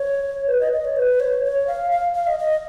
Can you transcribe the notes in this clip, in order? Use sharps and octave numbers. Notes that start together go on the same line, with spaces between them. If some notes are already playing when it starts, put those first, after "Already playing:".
Already playing: C#5
B4
D#5
D#5
C#5
B4
C#5
C#5
F5
F5
F5
D#5
D#5